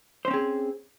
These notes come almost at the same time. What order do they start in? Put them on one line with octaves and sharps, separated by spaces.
C5 C#4 C4 G#4